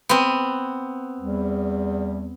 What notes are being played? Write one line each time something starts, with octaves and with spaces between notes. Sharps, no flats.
B3 C4
E2 G3